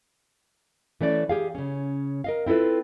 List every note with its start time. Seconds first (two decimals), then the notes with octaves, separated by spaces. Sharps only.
1.01 E3 A3 C#4 D5
1.29 G4 G#4 F5
1.55 C#3 C#4
2.24 A#4 D#5 F5
2.46 C4 E4 F4 A4 B4